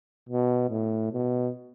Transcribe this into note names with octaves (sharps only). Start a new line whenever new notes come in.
B2
A2
B2